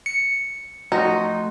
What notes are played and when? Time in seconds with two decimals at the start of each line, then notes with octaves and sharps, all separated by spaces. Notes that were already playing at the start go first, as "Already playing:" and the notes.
0.06 C#7
0.92 F3 A3 D#4 F#4 C6